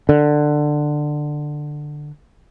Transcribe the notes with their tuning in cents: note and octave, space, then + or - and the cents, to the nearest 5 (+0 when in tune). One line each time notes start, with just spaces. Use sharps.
D3 +15